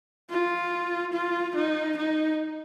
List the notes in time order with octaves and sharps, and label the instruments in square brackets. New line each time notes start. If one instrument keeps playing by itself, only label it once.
[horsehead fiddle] F4
F4
D#4
D#4